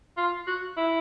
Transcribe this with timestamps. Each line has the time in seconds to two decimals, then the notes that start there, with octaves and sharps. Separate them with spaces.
0.18 F4
0.48 F#4
0.77 E4